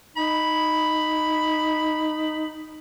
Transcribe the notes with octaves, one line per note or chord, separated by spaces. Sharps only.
D#4 B5